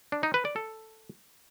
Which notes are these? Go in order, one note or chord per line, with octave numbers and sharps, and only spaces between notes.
D4
D#4
B4
D5
A4